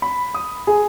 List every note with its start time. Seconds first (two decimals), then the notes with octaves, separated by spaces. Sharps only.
0.02 B5
0.34 D#6
0.67 G#4